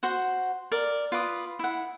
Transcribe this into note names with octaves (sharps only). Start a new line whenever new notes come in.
F#4 C5 F#5
A#4 D5
F4 B4 D6 D#6
E4 F#5